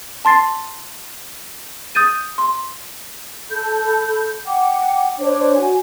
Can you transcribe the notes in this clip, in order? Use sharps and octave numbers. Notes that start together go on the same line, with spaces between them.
A5 C6 A6 C7
D#6 G6 A6 D#7
C6
A4 B5 G6
F#5 G5 D6
D4 C5 C#5 D6
F#4 G#5